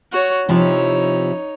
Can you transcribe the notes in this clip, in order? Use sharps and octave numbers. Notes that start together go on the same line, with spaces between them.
F#4 C#5
C3 F3 D#4 E4 C#5